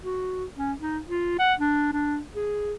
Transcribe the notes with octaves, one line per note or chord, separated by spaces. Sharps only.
F#4
C#4
D#4
F4
F#5
D4
D4
G#4